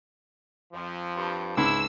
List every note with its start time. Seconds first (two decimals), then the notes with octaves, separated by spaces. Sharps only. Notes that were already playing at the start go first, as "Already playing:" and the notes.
0.73 F2 F3
1.16 G2
1.57 C#2 G#2 E4 E6